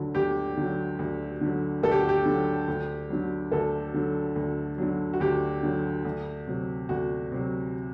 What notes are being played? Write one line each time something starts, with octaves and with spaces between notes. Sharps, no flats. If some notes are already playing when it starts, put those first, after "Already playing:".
Already playing: D2 D3 F#3
D2 G4
D3 F#3
D2
D3 F#3
D2 A4
G4
F#4
G4
D3 F#3
D2
D3 F#3
D2 A4
D3 F#3
D2
D3 F#3
F#4
D2 G4
D3 F#3
D2
C3 F#3
D2 F#4
C3 F#3